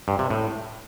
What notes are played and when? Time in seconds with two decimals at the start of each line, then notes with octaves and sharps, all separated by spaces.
0.08 G2
0.19 C3
0.30 A2